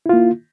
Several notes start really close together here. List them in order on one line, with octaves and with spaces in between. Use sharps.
E4 F4 A#3